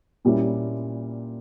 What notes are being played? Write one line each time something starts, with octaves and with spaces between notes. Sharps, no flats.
A#2 G3 A#3 C#4 E4